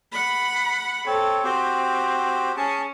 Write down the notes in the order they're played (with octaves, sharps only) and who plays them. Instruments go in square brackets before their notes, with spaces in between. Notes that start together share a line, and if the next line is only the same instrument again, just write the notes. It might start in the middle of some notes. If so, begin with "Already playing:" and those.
[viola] F#5 B5
[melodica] C4 C#5 [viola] A4
[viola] C4 [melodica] F#4 G4 C5
[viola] C#4 [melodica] G#4 A5